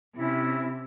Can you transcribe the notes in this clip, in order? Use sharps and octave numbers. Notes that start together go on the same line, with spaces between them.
C3 C#4 E4